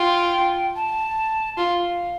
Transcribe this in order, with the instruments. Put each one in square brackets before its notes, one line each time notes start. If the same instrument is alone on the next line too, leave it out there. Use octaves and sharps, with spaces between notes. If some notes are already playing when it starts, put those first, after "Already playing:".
Already playing: [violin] F4 [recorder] G5
[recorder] A5
[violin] F4 [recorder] F5